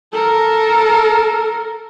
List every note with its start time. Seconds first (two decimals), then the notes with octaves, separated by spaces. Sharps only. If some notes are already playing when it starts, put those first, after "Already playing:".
0.13 A4 A#4